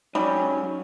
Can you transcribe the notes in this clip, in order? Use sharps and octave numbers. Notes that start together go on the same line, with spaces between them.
G#2 F#3 G3 C#4